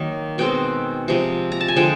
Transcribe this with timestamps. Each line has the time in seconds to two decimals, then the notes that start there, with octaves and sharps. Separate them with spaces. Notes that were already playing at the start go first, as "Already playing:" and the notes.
Already playing: D#3 F#3 A#3 D#4
0.38 B2 G#3 C4 G5
1.08 C3 F3 G#3
1.52 A#5
1.61 A5
1.68 G#5
1.76 D3 F3 G#3 G5